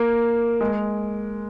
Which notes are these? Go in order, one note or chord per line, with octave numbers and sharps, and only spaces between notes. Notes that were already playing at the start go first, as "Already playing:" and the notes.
Already playing: A#3
G#3